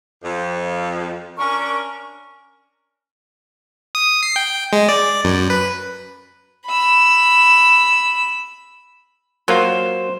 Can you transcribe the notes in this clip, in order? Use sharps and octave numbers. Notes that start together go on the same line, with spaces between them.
F2
C#4 D4 A#4 C#6
D#6
C7
G5
G#3
D5
F#2
B4
B5 E6
F#3 A#3 F4 C5